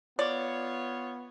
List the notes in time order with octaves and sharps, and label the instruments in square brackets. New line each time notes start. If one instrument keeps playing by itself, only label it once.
[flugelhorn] B3 [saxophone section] F4 C#5 [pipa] D5